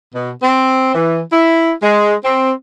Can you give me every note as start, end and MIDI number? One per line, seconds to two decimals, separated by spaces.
0.13 0.31 47
0.42 0.90 60
0.93 1.19 52
1.31 1.70 64
1.81 2.12 56
2.23 2.50 60